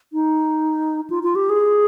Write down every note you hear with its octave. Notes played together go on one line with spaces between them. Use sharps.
D#4
F4
F4
G4
G#4